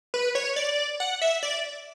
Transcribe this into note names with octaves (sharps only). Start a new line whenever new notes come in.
B4
C#5
D5
F#5
E5
D5